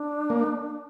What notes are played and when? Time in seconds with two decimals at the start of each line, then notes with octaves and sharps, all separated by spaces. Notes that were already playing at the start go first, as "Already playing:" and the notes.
Already playing: D4
0.30 A#3